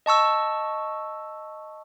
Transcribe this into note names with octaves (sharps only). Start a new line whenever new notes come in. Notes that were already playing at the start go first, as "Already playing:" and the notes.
D#5 A5 C#6 E6